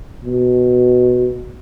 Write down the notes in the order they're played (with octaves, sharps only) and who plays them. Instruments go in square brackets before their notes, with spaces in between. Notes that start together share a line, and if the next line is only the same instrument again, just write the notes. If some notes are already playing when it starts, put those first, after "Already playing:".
[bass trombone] B2